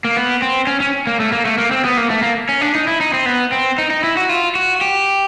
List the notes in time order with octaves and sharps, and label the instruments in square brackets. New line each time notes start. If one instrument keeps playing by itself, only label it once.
[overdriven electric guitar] A#3
B3
C4
C#4
C#4
A#3
A3
A#3
A3
A#3
C4
B3
A#3
A3
A#3
C#4
D4
D#4
E4
D#4
C4
B3
C4
D#4
D#4
E4
F#4
F4
F#4
G4